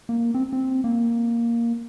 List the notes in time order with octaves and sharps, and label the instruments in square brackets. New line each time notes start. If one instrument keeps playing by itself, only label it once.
[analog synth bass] A#3
C4
C4
A#3